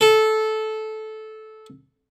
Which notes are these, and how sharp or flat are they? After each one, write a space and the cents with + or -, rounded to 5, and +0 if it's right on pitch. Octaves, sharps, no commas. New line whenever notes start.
A4 -15